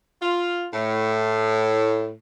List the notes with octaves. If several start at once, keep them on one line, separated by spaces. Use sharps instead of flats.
F4
A2